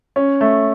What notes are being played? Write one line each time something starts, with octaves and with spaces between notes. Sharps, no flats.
C#4
A3